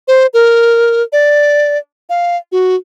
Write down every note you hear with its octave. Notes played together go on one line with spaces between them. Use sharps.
C5
A#4
D5
F5
F#4